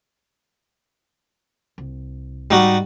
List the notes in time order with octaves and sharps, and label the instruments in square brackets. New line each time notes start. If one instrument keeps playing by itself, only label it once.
[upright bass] C2
[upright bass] G#2 [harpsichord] G3 D#4 F#4